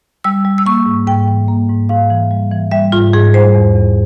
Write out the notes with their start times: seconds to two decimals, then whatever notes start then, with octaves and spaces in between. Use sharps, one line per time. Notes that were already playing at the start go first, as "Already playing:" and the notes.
0.24 G3 E6
0.45 G3
0.58 E6
0.66 A#3 C#6
0.86 G#2
1.07 G#2 G5
1.28 E3
1.48 A#3
1.69 G#2
1.89 G#2 F5
2.10 E3
2.31 G3
2.51 E3
2.71 G3 E5
2.92 G#2 F4
3.13 G#2 G#4
3.34 G3 C5
3.55 E2
3.75 E2